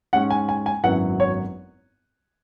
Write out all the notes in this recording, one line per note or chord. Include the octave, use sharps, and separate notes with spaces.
G#2 G#3 C#4 F#5
G#5
G#5
G#5
G#1 F#2 F#3 B3 E4 F#5
C#5